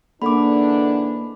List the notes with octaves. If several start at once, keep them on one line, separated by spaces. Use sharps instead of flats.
G#2 D3 E3 A#3 D4 B5 D6